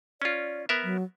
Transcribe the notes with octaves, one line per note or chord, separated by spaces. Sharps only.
C#4 F4 D5
B3 A#4 E5
F#3